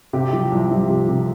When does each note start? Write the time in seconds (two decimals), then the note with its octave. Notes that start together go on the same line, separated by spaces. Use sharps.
0.13 C3 G4
0.33 F3
0.52 C2
0.71 F3
0.90 C3
1.08 C3